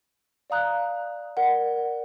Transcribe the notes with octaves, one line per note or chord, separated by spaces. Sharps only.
D5 F5 A#5 D#6 F#6
A#4 D5 F#5